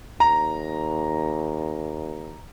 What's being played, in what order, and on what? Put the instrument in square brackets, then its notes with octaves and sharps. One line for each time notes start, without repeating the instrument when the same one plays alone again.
[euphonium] D#2 [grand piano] A#5